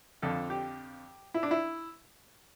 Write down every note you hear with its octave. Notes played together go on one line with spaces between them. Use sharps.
F2 D3 F3 A4
G4
E4
D4
E4